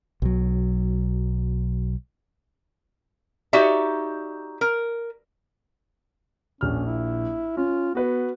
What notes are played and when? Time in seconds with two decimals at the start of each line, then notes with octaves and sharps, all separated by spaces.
0.22 B1 F#3
3.53 D#4 F#4 G4 D5 E5
4.61 A#4
6.61 A#1 C#4 F6
6.86 E4
7.57 C#4 F4
7.95 B3 F#4 B4